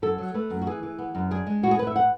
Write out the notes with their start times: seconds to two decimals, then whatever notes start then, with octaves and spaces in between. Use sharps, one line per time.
0.02 F#2 A4
0.18 F#3
0.34 A3 B4
0.50 F#2
0.62 F#4
0.67 E3 G#4
0.83 E3
0.98 B3
1.15 F#2
1.31 D4 G#4
1.47 G#3
1.63 A2 F#4
1.71 G#4
1.79 A2 B4
1.87 E5
1.96 F#5